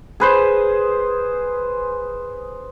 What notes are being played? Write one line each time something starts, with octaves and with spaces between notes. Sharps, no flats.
G#4 B4 C5